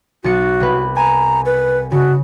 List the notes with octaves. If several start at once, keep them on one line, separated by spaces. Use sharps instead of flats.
B1 F#4 A6 C#7
C2 B4
G#5 A#5
B4
C#3 F#4